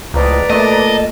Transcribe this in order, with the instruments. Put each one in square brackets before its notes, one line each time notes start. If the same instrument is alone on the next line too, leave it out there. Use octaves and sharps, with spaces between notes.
[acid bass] C#2 [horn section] A2 F3 D#5 [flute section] B4 D5 A#5
[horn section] A#2 A#4 A5 [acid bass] A3 [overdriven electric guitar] D#5